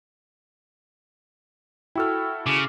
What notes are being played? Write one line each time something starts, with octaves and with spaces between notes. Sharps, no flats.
E4 F#4 A4 G5 E6 F6
C#3 D6 F6